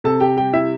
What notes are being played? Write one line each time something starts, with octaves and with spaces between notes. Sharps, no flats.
C3 A4 A5
G4 G5
G3 G4 G5
E4 E5